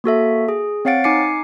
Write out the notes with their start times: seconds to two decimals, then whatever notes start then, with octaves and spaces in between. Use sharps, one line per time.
0.04 A#3 F#4 A4 E5
0.49 G#4
0.85 C4 C#5 F5 F#5 A6 D7
1.04 D#4 G#5 D6 C7 C#7